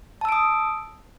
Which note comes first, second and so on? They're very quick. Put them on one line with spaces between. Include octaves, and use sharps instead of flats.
A5 E6 D7 D#6